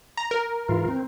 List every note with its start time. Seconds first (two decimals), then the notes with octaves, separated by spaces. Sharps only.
0.17 A#5
0.31 A#4
0.68 G#2 E3 F4
0.88 C4